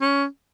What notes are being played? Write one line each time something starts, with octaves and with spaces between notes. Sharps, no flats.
C#4